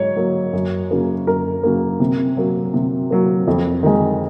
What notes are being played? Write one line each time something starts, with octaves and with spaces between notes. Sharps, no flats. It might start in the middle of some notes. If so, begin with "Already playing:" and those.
Already playing: G#2 F#3 C#5
F#3 A#3
F#2
C#3 F#3 A#3
F#2 A#4
C#3 F#3 A#3
C3
F#3 A#3
C3
F#3 A#3
F2
D#3 G#3